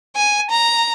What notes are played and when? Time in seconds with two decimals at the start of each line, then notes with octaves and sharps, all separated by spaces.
0.16 G#5
0.50 A#5